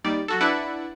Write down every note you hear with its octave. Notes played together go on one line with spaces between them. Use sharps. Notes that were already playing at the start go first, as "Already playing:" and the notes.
D#2 D#3 G3 D5
F#3 F#4 A4
D4 E4 B4 D5 E5 F#5